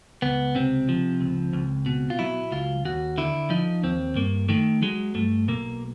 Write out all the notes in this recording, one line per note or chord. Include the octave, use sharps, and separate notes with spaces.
C#2 B3
C3 C4
F3
C#2
C#2
B2
F4
F#3 E4
C#2 F4
D#2 F#4
D3 E4
F3 D#4
D#2 C4
G2 A#3
D#3 A3
F#3 G#3
G2 A3
B1 A#3